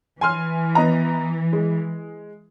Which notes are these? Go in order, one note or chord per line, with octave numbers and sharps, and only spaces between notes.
E3 G#5 C6 F6
B3 D#5 A#5
G#3